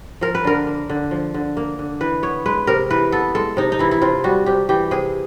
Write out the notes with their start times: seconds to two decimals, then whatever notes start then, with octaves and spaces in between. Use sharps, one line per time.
0.21 F3 A#4
0.35 B4
0.45 D3 A#4
0.67 A#3
0.90 D3
1.11 F3
1.34 D3
1.57 A#3
1.79 D3
2.01 E3 B4
2.23 B3 C#5
2.46 G#3 B4
2.67 C3 A#4
2.90 E3 B4
3.12 B3 A4
3.35 G#3 A4
3.57 C3 D#4
3.72 D#4
3.79 E3 E4
3.91 E4
4.02 C3 F4
4.24 G3 F#4
4.46 C3 G4
4.69 E3 G4
4.91 C3 G#4